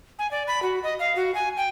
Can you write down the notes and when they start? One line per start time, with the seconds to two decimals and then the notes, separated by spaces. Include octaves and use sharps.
0.19 G#5
0.31 D5
0.47 B5
0.62 F#4
0.83 D#5
0.99 F5
1.16 F#4
1.35 G#5
1.57 G5